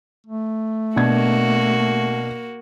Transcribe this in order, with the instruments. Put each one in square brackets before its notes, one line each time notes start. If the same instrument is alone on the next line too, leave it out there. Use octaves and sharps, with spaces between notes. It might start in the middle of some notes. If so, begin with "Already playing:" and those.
[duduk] A3
[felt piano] B2 D4 G#6 [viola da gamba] A#3 F#4